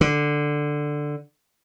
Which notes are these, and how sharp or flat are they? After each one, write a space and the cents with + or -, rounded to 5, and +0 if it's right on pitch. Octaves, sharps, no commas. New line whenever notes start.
D3 +5